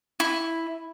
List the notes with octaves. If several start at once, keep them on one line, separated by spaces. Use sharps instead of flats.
E4